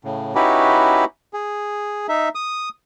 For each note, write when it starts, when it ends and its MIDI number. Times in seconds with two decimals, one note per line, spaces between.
0.05 0.34 45
0.05 0.34 49
0.35 1.05 61
0.35 1.05 63
0.35 1.05 64
0.35 1.05 66
0.35 1.05 67
0.35 1.05 71
1.34 2.07 68
2.09 2.29 63
2.09 2.29 76
2.35 2.69 87